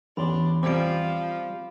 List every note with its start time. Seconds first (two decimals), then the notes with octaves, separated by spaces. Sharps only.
0.17 A1 E2 D4 C#5 B5 C6 G7
0.63 F3 G3 C4 D6 D7